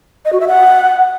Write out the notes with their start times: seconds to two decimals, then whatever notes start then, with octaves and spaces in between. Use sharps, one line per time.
0.25 D#5
0.33 F#4
0.40 E5
0.48 F#5